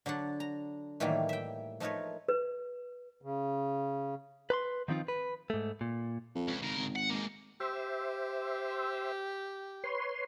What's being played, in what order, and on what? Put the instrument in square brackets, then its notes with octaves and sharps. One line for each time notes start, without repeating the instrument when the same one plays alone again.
[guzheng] D3 F#3 D4 F#5
A#5
A2 D#3 E3 F#3 G3 A#3
E5 G5
F3 A3 D#4 A#4 B4 C#5
[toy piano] B4
[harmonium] C#3
[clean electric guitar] B4 B5 C6
D#3 F3 C4 D#4 F4
B4
G#2 A3
A#2
[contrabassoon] F2
[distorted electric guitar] C#2
[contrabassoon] G#1 [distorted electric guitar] C#3 A#4
[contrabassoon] G#1
[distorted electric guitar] F#5
G#3 A#3
[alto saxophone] G4 [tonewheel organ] C5 E5
[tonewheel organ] B4 C#5 C6